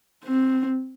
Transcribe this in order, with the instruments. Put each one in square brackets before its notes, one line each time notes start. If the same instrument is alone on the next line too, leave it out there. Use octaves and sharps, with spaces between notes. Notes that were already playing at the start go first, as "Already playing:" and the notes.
[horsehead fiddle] C4